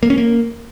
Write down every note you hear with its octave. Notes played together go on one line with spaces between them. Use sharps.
A#3
C#4
A#3